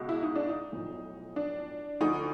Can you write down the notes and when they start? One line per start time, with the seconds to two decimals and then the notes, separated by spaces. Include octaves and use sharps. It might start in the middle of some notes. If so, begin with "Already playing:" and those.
Already playing: C#2 B2
0.09 E4
0.23 D#4
0.36 D4
0.49 D#4
0.72 B1 A2 F3
1.36 D4
2.01 D2 D3 F3 D#4